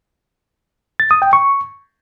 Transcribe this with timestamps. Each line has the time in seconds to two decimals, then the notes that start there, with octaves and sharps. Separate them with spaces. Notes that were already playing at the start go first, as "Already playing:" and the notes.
1.00 A6
1.11 D#6
1.22 G5
1.33 C#6